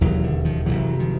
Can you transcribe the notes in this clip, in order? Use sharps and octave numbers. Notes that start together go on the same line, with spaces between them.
E1 D#2 C#3 E3 F#3
D3
D#3 F3
F#1 E2 C3 E3 F#3
D#3 F3